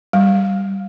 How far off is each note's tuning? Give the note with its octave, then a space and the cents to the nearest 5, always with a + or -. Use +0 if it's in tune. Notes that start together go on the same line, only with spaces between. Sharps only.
G3 -10